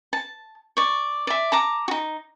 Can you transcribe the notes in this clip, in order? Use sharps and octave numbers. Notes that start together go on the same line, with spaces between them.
A5
D5 C#6
D5 E5
A5 A#5 D6
D#4 F#4